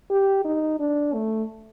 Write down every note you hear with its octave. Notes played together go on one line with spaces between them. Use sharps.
G4
D#4
D4
A3